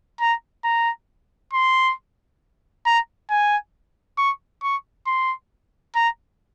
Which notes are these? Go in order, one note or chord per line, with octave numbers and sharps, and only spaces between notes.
A#5
A#5
C6
A#5
G#5
C#6
C#6
C6
A#5